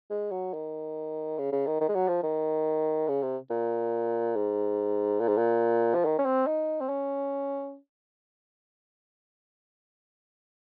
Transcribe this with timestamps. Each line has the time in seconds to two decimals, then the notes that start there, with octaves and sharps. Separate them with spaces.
0.10 G#3
0.31 F#3
0.53 D#3
1.38 C#3
1.52 C#3
1.67 D#3
1.81 D#3
1.89 G#3
1.95 F#3
2.08 F3
2.23 D#3
3.08 C#3
3.22 C3
3.50 A#2
4.35 G#2
5.20 A#2
5.28 G#2
5.37 A#2
5.95 F3
6.05 D#3
6.19 C#4
6.26 C4
6.46 D#4
6.81 C4
6.89 C#4